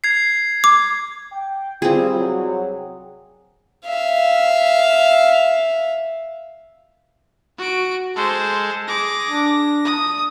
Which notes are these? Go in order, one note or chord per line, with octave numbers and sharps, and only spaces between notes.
G#6 C7
D6
G5
G3 C4 F4 G#4
C2 F#3
E5 F5
F#4 D7
G#3 A4 C5
G#4 D6 A#6
D4
D#6